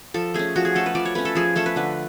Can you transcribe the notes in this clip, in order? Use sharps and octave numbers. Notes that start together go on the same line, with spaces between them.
F3 A4
A3 C#4 G#4
F3 F#4
G#4
A3 C#4 A4
B4
F3 D5
C#5
A3 C#4 B4
A4
F3 G#4
A3 C#4 A4
B4
D3 B4